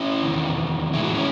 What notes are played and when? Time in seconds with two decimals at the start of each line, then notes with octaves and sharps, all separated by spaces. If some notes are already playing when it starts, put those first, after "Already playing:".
Already playing: C#4 E4
0.23 E2 C3 D#3
0.93 A2 E3 G#3 E4
1.04 F#4
1.15 C#4 E4